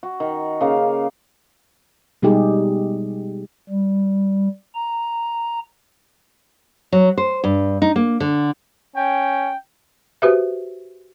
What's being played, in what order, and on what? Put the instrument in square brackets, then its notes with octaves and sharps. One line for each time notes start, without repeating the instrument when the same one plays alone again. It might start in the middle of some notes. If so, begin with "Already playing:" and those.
[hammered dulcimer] F#4
D#3
C#3 A#3 F5
[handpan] B2 G3 G#3 D#4 G4 G#4
[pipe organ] G3
A#5
[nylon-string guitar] F#3
C5
G2
D#4
A#3
D3
[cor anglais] C#4 [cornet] G5
[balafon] F#4 G4 B4 C5 E5